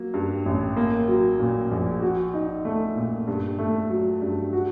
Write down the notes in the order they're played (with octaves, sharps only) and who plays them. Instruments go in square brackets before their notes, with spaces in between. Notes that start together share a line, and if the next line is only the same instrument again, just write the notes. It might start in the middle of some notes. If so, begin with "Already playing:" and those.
Already playing: [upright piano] F#3 A#3
G2
A1
A#3
F#3
A#2
A#1
F#4
D#4
A3
A#2
G2
A3
F#3
G2
F#4